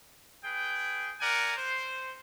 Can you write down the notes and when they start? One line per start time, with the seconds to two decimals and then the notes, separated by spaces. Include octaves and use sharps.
0.45 G#4 B4 G5
1.21 A#4 D5 F#5 G#5
1.57 C5